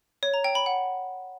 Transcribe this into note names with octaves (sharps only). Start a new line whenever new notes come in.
C#5
A#5
G5
B5
F#5